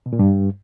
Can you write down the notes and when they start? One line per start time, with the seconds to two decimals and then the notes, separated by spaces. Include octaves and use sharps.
0.06 B2
0.13 A#2
0.19 G2